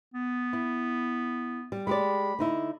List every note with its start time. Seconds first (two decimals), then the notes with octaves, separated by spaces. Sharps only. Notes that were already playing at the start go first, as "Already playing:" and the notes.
0.14 B3
0.53 E4
1.72 G3
1.87 G#3 G4 D5 B5
2.39 D3 D#4 E4